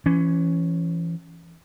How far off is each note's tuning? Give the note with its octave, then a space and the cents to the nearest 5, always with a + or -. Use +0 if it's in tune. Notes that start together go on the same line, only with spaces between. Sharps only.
E3 +30 C#4 +0